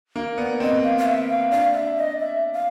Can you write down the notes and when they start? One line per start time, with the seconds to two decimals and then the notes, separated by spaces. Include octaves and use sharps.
0.16 A#3
0.38 B3 D5
0.60 C4 D#5
0.84 F5
0.98 F5
1.06 E5
1.29 F5
1.51 D4 F5
1.74 E5
1.98 D#5
2.20 E5
2.53 F5